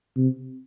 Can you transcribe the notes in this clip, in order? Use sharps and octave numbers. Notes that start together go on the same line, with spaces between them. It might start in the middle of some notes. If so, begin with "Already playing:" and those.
C3